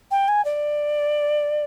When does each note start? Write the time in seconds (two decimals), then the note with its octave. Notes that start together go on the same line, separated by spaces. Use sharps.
0.11 G5
0.28 G#5
0.44 D5